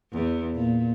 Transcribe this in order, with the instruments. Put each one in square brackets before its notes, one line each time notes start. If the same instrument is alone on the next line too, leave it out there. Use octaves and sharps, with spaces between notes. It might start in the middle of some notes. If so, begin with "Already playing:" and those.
[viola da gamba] E2
A#2